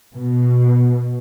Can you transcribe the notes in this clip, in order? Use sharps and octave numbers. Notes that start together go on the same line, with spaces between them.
B2